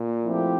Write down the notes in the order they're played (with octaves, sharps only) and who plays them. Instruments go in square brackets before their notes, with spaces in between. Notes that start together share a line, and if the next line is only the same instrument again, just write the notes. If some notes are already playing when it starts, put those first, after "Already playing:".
Already playing: [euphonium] A#2
[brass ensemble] F3 A3 C4 E4 G4